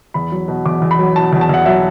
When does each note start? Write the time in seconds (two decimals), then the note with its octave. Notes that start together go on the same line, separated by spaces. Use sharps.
0.14 E2 B5
0.32 F#3
0.48 B2
0.66 E2 D6
0.82 E2
0.91 B5
0.99 F#3
1.16 B2 A5
1.33 E2
1.41 A5
1.49 E2 F#5
1.65 F#3 E5